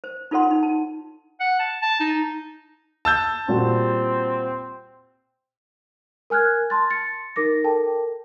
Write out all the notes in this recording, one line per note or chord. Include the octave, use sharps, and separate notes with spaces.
C5
D#4 F4 A4 C#5 F#5 C6
D#4
A5
F#5
A5
A5
D#4
A5 E6 G6
A#2 G3 C4 F#4
A#4 G#5 F6 F#6 G#6
A5 C6 A6
A6 C#7
D#4 A#4 D6 A#6
A4 A#4 G5 A5